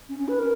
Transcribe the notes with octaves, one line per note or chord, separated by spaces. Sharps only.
C#4
C#4
B4
A#4